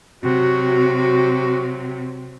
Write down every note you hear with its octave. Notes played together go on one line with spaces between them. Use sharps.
C3 F#3 F#4